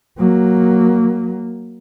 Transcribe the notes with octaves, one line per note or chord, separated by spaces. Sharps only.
F#3 A#3